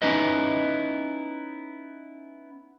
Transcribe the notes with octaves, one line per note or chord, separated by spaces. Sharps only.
B3 C#4 D#4 E4 B4 D#5